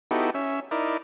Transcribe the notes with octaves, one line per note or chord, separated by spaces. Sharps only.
B3 D#4 E4 F#4 G4 A4
C#4 E5
D#4 E4 A#4 D5